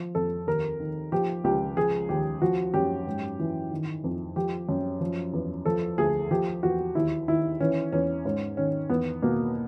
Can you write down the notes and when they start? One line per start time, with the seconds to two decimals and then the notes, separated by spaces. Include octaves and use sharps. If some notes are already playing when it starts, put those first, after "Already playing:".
Already playing: F3
0.15 F2 A4
0.47 D#2 A#4
0.80 D#3
1.12 F3 G4
1.44 C#2 G4
1.77 F3 G#4
2.09 D#2 G4
2.42 F3 F#4
2.74 F#2 G4
3.07 G#2
3.39 E3
3.72 D#3
4.04 F2
4.36 F3 G4
4.69 F#2
5.00 F3
5.33 E2
5.66 F3 A4
5.98 D2 G#4
6.31 F3 G4
6.63 E2 F#4
6.95 D#2 E4
7.28 D#3 E4
7.60 E3 C#4
7.92 E2 C#4
8.25 G#2 C#4
8.57 D#3 C#4
8.89 E2 B3
9.22 B2 A#3